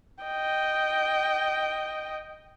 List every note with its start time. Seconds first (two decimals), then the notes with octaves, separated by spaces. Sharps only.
0.24 D#5 G5